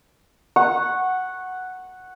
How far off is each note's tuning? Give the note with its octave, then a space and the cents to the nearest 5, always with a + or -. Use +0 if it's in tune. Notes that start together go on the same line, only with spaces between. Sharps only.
F#5 +0 C#6 -15